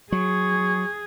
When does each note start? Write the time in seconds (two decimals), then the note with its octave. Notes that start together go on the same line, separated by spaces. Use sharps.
0.12 F#3 G#4 C#6